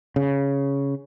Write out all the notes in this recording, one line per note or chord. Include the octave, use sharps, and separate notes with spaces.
C#3